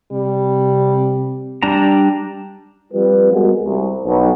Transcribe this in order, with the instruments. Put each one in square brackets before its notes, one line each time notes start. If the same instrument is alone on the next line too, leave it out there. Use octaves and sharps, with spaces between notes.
[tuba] C3 [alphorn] G3
[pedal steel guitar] G3 D4 A5 A#5
[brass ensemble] F3 G3 C4 F4 B4
G3 G#3 B3 F#4 A#4
C2
B1